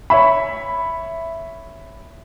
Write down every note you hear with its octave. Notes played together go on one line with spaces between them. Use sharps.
C#5 E5 B5